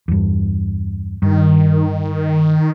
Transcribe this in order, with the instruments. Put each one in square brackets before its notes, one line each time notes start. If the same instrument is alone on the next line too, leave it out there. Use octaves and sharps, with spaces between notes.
[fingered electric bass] E2 G2
[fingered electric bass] G2 [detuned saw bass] D#3